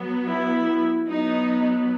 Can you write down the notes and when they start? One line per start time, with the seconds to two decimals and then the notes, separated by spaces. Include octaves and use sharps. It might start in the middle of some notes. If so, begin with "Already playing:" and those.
Already playing: F#3 B3
0.29 E4
1.07 F#3 B3 D#4